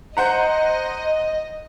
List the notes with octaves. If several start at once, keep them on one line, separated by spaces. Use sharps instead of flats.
C5 D#5 F#5 A#5